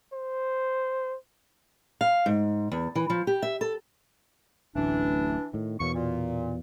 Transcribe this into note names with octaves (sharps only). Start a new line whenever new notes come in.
C5
F5
G#2
E2
E3
F3
G4
E5
A4
D1 A1 E3 D4
A2 D#3
E2 B2 F#3 A#3 C#6
A#2